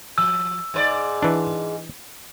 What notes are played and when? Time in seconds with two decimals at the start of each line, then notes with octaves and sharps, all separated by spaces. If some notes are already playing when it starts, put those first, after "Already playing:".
0.18 F3 E6
0.74 G#2 B4 D5
1.22 E3 D4